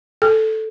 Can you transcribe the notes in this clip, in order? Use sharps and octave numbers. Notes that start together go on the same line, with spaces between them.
A4